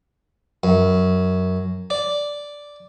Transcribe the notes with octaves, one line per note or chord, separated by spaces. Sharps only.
F#2
D5